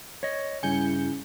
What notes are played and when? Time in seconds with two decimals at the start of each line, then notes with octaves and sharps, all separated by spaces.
0.23 C#5 D#5
0.63 G2 C#3 E4 G#5 G6 C#7